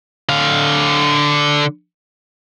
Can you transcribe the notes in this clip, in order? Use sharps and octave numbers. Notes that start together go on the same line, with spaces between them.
D3 F5